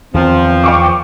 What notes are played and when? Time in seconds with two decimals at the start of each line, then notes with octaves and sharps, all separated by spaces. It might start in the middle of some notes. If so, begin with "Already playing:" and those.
0.14 E2 D#3 F3 C4
0.64 G5 C#6 D6